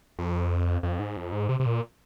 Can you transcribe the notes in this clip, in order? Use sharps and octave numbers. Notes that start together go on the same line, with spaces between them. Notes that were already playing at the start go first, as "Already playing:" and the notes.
F2
F2
G#2
F2
G#2
C3
C3
A#2